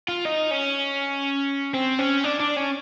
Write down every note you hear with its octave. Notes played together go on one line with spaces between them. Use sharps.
F4
D#4
C#4
C4
C#4
D4
D4
C#4